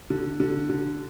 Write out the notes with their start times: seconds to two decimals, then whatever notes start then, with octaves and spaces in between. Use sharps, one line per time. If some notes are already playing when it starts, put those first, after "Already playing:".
0.10 D3
0.40 D3
0.70 D3